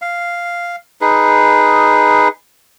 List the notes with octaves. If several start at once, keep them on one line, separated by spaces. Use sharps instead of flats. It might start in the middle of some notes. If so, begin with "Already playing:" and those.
F5
D#4 G#4 B4